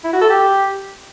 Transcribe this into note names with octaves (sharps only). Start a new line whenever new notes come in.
E4
F#4
A4
G4